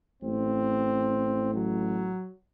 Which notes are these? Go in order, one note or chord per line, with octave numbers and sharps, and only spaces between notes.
A1 C4
F#3